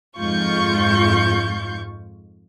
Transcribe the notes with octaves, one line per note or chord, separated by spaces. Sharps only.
F2 G#2 F4 C#6 G6